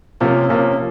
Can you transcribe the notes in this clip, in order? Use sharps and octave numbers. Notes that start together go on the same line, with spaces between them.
C3 F3 A#3 C#4
C3 F3 A#3 C#4